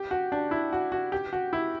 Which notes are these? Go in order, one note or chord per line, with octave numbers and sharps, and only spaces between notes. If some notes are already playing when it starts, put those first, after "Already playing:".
Already playing: G4
F#4
D4
E4
F#4
F#4
G4
F#4
E4